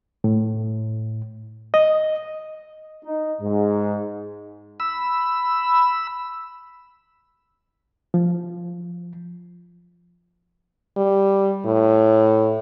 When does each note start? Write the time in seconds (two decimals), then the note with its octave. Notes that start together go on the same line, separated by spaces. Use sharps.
0.24 A2
1.74 D#5
3.05 D#4
3.41 G#2
4.80 B5 E6
8.14 F3
10.97 G3
11.65 A2